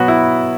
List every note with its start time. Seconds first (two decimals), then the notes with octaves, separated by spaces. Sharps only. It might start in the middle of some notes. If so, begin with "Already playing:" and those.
Already playing: B2 F#3 B3 F#4
0.08 E4